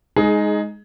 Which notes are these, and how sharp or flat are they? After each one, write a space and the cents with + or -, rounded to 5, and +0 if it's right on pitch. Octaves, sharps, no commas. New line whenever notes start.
G#3 +0 D#4 +0 G#4 +20